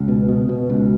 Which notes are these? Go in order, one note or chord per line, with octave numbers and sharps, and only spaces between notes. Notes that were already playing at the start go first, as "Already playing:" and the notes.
Already playing: C#2
B2
B2
B2
C#2